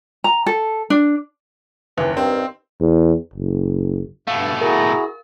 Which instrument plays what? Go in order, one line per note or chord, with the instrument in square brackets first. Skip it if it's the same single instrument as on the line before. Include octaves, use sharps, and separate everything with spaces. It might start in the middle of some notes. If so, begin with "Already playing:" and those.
[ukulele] A#5
A4
D4
[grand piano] F#1 D#2 [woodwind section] E3
[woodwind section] G2 D#3 [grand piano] C4
[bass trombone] E2
F#1
[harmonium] G2 [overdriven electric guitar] B2 A3 [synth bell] F5
[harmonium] E4 F#4 G#4 [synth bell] A#4 [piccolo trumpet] A#5